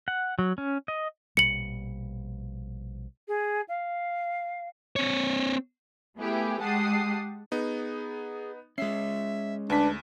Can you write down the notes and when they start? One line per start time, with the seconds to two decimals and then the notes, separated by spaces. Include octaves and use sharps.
0.08 F#5
0.39 F#3
0.58 C#4
0.88 D#5
1.37 A#1 B2 G3 C#7 F#7
3.28 G#4
3.68 F5
4.96 C4 C#5
6.17 A3 B3 E4 G4 G#4
6.59 G#3 G4 F#5 A5 D#6 C7
7.52 B3 D#4 G#4
8.78 G#3 C#4 E5 C7
9.70 D2 D4 B4 B6